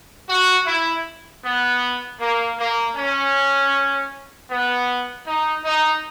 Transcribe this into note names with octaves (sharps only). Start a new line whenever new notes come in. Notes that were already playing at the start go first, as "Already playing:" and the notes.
F#4
E4
B3
A#3
A#3
C#4
B3
D#4
D#4